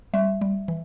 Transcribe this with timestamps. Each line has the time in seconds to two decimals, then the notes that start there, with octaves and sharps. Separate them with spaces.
0.14 G3 E5
0.41 G3
0.68 E3